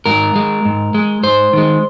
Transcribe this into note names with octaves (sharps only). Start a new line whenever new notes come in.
G#2 A#4
G#3
G#2
G#3
G#2 C5
D#3 G#3